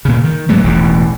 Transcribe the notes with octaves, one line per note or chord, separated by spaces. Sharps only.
A#2 C#3
D#3
G#2 F#3 G#3 A3
E1 A1 E2 G#2